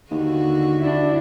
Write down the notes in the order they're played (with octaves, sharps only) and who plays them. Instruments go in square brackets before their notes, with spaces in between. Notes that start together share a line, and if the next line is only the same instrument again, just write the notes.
[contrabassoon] D#2 [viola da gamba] D3 F#4
[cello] D4 E4